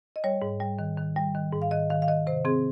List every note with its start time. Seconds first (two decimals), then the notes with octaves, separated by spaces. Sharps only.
0.16 D#5
0.24 G3 C#5
0.42 G#2
0.60 G3
0.79 D#3
0.97 D#3
1.16 G3
1.34 D#3
1.53 G#2
1.62 F5
1.71 D#3 D#5
1.90 D#3 F5
2.02 F5
2.08 D#3 D#5
2.27 C3 C5
2.45 C4 G#4